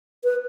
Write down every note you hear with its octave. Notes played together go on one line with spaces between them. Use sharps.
B4